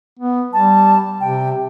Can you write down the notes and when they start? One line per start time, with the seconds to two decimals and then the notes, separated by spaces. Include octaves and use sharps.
0.19 B3
0.53 G3 A5
1.20 C3 G5